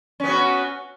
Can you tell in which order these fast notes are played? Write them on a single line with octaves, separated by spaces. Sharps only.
C#4 B3 F#4